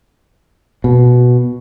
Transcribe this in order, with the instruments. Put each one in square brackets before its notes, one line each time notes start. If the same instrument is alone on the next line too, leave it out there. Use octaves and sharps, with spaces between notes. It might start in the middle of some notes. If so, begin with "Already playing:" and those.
[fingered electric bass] B2